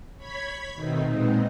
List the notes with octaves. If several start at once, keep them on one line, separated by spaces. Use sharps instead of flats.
C#5 B5 G#6 B6
B2 D#3 A3 C4 D#4
A#2 G#3 B3 C4 D#4